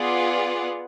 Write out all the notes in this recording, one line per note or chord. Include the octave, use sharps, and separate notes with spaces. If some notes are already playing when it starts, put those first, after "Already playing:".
Already playing: B3 F4 G#4 D5 F#5